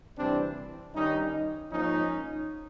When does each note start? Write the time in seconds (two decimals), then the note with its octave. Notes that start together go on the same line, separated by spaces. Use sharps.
0.17 D2 C3 E3 G3 C4 D4
0.94 G2 D#3 G3 C#4 D#4
1.72 G#2 F3 A#3 C#4 D#4